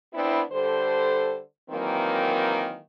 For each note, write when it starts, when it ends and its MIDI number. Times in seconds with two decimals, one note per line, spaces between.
0.14 0.42 59
0.14 0.42 60
0.14 0.42 62
0.14 0.42 64
0.52 1.38 50
0.52 1.38 55
0.52 1.38 69
0.52 1.38 72
1.70 2.78 51
1.70 2.78 52
1.70 2.78 54
1.70 2.78 58
1.70 2.78 60